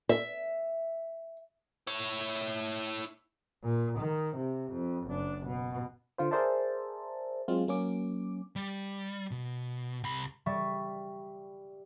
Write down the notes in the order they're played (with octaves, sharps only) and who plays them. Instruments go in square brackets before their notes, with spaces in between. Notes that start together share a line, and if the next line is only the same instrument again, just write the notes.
[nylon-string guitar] E5
[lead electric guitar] E4 C#5
[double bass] A#2
D#3
C3
F2
F#1 D4
B2
[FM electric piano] D3 F4 C5
G#4 A#4 C5 D5 E5 A5
F#3 G#3 C4 F4
F#3 A#3 C#4 D6
[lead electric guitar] G3
B2
C2 B5
[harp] G3 E5 C#6 A6 B6